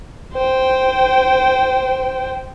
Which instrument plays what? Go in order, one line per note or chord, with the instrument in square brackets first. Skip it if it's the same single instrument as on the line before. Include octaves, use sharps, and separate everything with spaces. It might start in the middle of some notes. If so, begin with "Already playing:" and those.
[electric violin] C5 G5